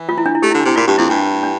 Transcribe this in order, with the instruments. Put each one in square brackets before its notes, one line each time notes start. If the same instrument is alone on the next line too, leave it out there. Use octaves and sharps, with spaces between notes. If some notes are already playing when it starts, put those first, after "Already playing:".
Already playing: [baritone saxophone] E3
[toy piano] F4
E4
D4
E4
[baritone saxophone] A3 [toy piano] G4
[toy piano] E4
[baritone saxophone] D3
[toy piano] D4
[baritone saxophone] C3 [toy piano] E4
[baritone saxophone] A#2 [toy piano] F4
[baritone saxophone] G2 [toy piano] G4
[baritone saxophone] F2 [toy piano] E4
[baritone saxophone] G2 [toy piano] D4
[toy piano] D4